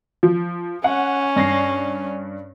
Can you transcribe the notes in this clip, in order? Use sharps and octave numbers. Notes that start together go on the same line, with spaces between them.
F3
C#4 F#5
G2 A#6 C7